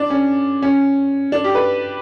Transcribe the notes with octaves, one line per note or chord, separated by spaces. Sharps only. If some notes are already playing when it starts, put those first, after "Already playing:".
Already playing: D4
C#4
C#4
D4
G4
B4